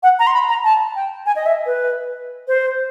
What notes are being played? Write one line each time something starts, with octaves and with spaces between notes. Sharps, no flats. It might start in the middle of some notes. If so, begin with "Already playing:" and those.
F#5
A#5
C6
B5
A#5
A5
G5
G#5
D#5
E5
B4
C5